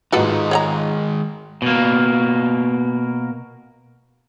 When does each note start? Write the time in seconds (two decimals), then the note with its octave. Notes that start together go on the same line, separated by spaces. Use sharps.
0.13 G#2 D#3 G#3 D#4 F4 F#4 A4 B4
0.51 C#5 F#5 A#5
1.62 B2 A#3